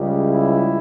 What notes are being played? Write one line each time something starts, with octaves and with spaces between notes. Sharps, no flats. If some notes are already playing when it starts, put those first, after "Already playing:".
Already playing: C#2 C#3 G3
E4